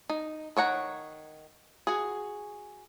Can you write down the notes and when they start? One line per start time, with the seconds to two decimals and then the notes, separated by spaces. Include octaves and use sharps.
0.09 D#4
0.57 D#3 C#5 F#5 A#5
1.87 F#4 G#4